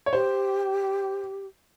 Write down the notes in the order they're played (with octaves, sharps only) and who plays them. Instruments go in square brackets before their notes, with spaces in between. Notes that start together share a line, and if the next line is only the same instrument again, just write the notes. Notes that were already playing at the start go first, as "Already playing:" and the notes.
[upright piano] C#5
[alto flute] G4 [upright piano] C5